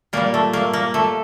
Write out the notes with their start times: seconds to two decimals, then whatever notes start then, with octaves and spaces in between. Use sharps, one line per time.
0.13 A#2 G3 A#3
0.34 A3
0.53 A#3
0.73 A#3
0.94 A3